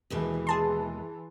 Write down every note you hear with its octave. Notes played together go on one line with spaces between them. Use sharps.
D#2 B2 E3 G#3
G#4 A5 C6